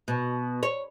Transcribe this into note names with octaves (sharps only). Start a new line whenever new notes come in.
B2
C#5